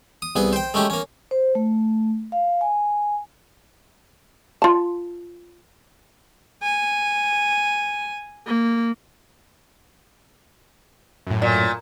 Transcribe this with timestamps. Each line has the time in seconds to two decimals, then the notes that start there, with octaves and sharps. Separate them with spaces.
0.22 D#6
0.36 C2 B3 G#4
0.53 C5 G5
0.74 G#3 A3 C#4 G4
0.90 A#3 C#4
1.31 C5
1.55 A3
2.32 F5
2.61 G#5
4.62 F4 A5
6.63 G#5
8.47 A#3
11.27 F#2 A2
11.42 A#2